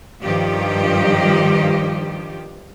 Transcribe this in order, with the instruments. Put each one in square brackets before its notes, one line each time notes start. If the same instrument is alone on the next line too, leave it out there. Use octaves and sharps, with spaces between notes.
[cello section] G2 D#3 F3 G4